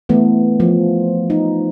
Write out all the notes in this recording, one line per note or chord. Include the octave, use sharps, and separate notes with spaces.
E3 A3 B3
F3
D#4